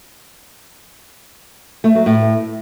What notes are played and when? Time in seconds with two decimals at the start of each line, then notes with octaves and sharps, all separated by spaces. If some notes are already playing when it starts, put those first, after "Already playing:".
1.84 A3
1.95 F#3
2.06 A2